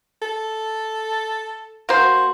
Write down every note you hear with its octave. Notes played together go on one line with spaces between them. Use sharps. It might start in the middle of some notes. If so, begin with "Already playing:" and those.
A4
A#3 F#4 C5